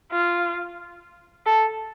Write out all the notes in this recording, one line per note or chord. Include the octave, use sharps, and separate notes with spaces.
F4
A4